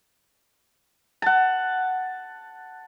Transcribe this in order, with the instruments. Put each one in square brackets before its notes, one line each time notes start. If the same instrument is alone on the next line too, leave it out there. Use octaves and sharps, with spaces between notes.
[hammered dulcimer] F#5 A5